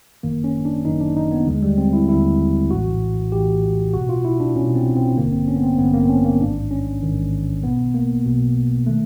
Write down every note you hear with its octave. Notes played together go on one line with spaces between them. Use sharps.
G1 F#2 D#3 A#3
C#4
D4
G1 F#2 D#3 D#4
D4
D#4
B3
D#2 D3 G#3
G3
C4
E4
D#2 D3 E4
A#1 A2 E3 F#4
A#1 A2 E3 G4
C2 B2 F#4
F4
E4
D4
C2 B2 C#4
C4
C4
A1 G2 D3 A#3
C4
C#4
B3
C4
A1 G2 D3 B3
A#3
C4
C#4
A#3
A1 G#2 D#3 D4
C#4
A1 G#2 D#3
B1 B2 B3
A#3
B1 B2
D#3 A3